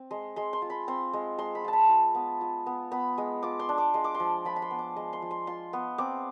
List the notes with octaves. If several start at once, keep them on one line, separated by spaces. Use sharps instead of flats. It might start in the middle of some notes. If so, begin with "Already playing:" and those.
Already playing: C4
G#3 C6
G#3 C6
C6
F4
B5
C4 C6
G#3
G#3 C6
B5
F4 A5
B5
F4
B3
F4
B3
B3 B5
G#3
F4 D6
C6
D4
D6
G#3 C6
D6
C6
F3
F3 B5
B5
C6
B3
D6
G#3 C6
C6
F3
C6
F4 C6
B3
C4 D6